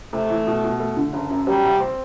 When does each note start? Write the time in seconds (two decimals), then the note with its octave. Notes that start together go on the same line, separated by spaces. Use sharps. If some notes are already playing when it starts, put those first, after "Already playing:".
0.13 C3 A3
0.30 E3
0.47 B2
0.64 B2
0.80 A3
0.97 D3
1.13 F#1
1.30 F#2
1.47 F#3 G3
1.63 C2
1.80 C4